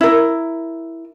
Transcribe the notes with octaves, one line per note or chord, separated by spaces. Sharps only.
E4 A#4